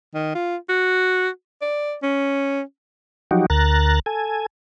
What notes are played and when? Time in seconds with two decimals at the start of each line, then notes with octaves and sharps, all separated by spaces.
0.14 D#3
0.35 F4
0.69 F#4
1.61 D5
2.03 C#4
3.31 F3 F#3 D#4 F#4 G4
3.50 D2 A#4 A#5 F#6 A6
4.06 A4 G#5